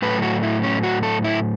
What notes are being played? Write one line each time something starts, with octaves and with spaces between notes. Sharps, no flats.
A2 F#3 A3 B4
F#4
E4
C#4
F#4
A4
E4